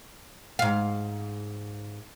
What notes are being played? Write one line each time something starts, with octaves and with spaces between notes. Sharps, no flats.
G#2 F5